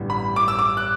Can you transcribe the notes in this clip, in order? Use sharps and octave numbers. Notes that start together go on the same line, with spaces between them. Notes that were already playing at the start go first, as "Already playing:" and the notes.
Already playing: A1 G2 D3 G3 B3
B5
D6
E6
D6
F#6